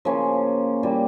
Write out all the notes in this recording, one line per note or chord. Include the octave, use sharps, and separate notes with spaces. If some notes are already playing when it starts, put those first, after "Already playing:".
C#3 F3 A#3 C#4
A#2 G3 A#3